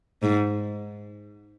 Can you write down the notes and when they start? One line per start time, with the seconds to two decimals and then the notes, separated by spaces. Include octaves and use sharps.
0.23 G#2